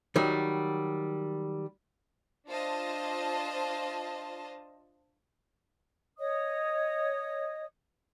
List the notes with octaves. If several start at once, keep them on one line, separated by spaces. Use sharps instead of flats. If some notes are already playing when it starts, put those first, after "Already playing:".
D#3 F#3 G3
D4 F4 C5 D#5 A5
C#5 D#5 D#6